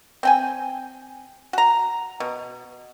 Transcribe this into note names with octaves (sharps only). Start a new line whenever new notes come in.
C4 G5 G#5
F#4 A#5
B2